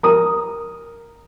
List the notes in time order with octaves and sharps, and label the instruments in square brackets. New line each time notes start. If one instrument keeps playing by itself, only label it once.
[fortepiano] A#4 D#6